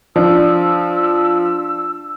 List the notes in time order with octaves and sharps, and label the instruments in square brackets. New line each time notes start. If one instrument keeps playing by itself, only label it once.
[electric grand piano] F3 [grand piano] D4 [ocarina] E6